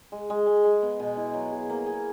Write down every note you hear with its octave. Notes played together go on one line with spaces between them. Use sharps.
G#3
G#3
G#3
G#3
B3
B2
E4
F#3
G#4
A#3
G#4